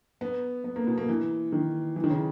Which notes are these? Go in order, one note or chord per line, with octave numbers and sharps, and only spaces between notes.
B3
B3
A#3
B2
A#3
E3
D#3
E3
D#3
C#3